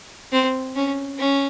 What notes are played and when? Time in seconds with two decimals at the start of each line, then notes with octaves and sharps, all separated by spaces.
0.32 C4
0.76 C#4
1.18 C#4